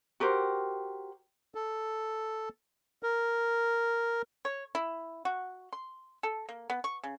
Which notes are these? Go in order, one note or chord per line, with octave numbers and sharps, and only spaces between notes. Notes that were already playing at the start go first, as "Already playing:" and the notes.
F#4 G4 A#4 C5
A4
A#4
C#5
E4
F#4
C6
A4
A#3
B3
C#6
C#3